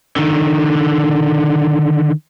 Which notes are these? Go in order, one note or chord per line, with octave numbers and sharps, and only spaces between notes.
D3 D#3